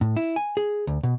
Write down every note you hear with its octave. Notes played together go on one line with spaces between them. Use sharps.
A2
E4
G#5
G#4
D2
B2